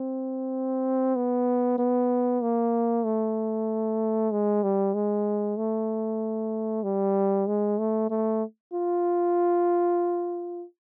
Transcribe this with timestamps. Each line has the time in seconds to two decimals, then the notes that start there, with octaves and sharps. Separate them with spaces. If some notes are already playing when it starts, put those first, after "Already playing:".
Already playing: C4
1.16 B3
1.79 B3
2.42 A#3
3.05 A3
4.31 G#3
4.63 G3
4.95 G#3
5.57 A3
6.83 G3
7.47 G#3
7.79 A3
8.10 A3
8.73 F4